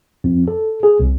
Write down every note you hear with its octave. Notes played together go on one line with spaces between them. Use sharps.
F2
A4
G#4
C2